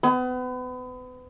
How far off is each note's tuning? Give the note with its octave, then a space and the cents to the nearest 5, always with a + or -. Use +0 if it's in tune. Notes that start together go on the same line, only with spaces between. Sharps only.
B3 +35